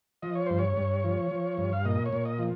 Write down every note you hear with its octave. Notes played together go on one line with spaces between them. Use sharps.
F3 D#5
C#5
G2 C5
C#5
G2
F3
F3
G2
F5
A#2 D#5
C#5
A#2
D#5
F3